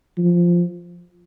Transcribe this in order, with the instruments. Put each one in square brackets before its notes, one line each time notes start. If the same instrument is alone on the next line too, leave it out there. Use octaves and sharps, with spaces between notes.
[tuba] F3